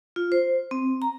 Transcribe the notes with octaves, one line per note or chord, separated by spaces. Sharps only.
F4
C5
C4
A#5